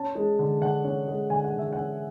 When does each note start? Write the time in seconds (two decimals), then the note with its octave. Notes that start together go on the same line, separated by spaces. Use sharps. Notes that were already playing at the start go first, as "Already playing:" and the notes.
Already playing: C#4 A5
0.15 G#3
0.39 D3
0.61 D3 F#5
0.84 C#4
1.08 G#3
1.30 D3 G#5
1.44 F#5
1.54 D3 E5
1.73 C#4 F#5